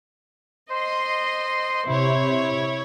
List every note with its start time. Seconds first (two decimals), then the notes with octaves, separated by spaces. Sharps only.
0.71 C5 D#5 C6
1.87 C3 E4 C#5